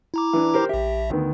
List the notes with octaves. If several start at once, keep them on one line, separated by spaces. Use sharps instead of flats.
E4 A#5 D6
E3 D4
G4 A#4 C5
A#1 G4 E5
D2 D#3 B3